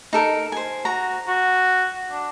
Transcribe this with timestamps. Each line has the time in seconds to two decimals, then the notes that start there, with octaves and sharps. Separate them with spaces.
0.13 D#4 A4 A#4
0.52 C5 G#5
0.85 F#4 A#5
1.28 F#4
2.11 D4